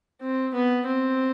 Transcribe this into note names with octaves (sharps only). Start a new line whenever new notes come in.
C4
B3
C4